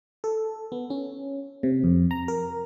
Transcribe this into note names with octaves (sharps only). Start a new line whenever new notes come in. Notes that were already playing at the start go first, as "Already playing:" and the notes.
A4
B3
C#4
C3
F2
A#5
A#4